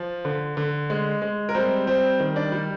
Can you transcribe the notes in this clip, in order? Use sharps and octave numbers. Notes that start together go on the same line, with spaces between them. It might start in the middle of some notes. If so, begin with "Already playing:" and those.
Already playing: F3
D3
D3
G#3
G#3
A#4
G3 C4 C5
G3 C4 C5
D#3
D4 D5
G3